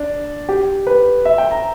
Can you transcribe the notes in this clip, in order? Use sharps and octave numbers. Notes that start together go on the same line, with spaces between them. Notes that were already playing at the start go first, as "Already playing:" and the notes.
Already playing: D4
G4
B4
E5
G5
A#5